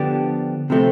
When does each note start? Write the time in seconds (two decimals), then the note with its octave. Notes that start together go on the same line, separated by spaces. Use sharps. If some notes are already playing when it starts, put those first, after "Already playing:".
Already playing: D3 F3 B3 D4 G4
0.70 C3 F3 A3 C4